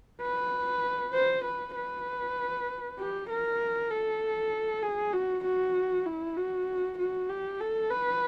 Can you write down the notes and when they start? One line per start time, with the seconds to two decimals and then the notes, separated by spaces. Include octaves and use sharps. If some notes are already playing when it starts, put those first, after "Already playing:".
0.22 B4
1.14 C5
1.45 B4
1.76 B4
2.99 G4
3.29 A#4
3.90 A4
4.82 G#4
5.13 F#4
5.44 F#4
6.06 E4
6.37 F#4
6.98 F#4
7.29 G4
7.60 A4
7.90 B4